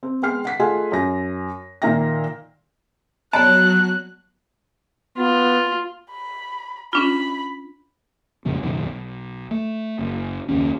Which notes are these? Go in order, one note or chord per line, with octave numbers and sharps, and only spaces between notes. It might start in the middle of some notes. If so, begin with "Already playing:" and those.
C4
G#3 B3 G5 F6 C7
F#5 B6 C7
A3 F4 G#4 D#5 F#5 G#5
F#2 A#6
A#2 D#3 A#3 E5 G5 A#6
F#3 B3 C#5 D5 A5 F#6
B3 F4
B5
C#4 D4 F4 B5
A#1 F2 C#3 G#3
C#2 F#2 B2 D#3
B1
A3
F#1
F#1 D#2 C#4